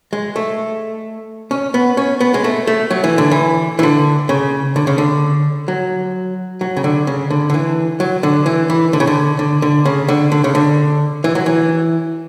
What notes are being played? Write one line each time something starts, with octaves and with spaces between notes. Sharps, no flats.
G#3
A3
C#4
B3
C#4
B3
G#3
A3
A3
F#3
E3
D3
E3
E3
D3
C#3
D3
C#3
D3
F#3
F#3
C#3
D3
C#3
D3
D3
E3
F#3
D3
E3
E3
D3
C#3
D3
D3
D3
C#3
D3
D3
C#3
D3
E3
F#3
E3